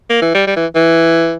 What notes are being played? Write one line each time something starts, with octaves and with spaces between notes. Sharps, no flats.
A#3
E3
G3
G3
E3
E3